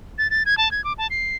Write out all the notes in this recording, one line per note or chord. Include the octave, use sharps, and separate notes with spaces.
A6
A6
G#6
A5
G#6
D6
A5
C7